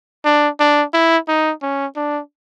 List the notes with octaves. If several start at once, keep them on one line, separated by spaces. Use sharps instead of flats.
D4
D4
E4
D#4
C#4
D4